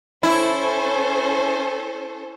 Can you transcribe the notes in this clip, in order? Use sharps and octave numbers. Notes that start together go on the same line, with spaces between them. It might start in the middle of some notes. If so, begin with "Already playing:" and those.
C#4 E4 A4 C5